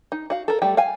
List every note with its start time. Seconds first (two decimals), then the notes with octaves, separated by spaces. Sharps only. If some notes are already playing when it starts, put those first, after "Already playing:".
0.12 D#4
0.30 F#4 F5
0.48 A4 A#4
0.62 G3 A3 G5
0.77 F5 G5 G#5